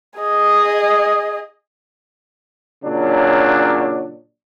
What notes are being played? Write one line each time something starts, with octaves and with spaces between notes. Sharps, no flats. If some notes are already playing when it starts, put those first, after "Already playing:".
G#4 D#5
A#2 C#3 F#3 D4